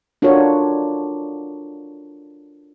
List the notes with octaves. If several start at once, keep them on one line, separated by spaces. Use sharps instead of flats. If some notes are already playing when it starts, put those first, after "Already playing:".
D4 F4 F#4 A4 A#4 C#5